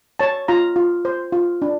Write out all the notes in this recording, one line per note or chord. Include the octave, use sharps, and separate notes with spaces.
C#5 A5
F4 A#5
F4
C5
F4
D4